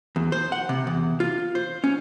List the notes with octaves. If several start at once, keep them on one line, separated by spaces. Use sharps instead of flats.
E2
C5
F#5
C3
E2
F4
C5
C#4